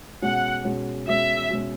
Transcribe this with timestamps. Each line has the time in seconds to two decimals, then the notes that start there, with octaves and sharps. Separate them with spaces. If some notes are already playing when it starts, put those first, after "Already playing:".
0.22 B2 G#3 C#4 F#5
0.65 B2 G#3 C#4
1.08 B2 G#3 C#4 E5
1.50 B2 G#3 C#4